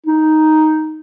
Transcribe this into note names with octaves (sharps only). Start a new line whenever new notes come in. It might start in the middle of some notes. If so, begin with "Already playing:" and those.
D#4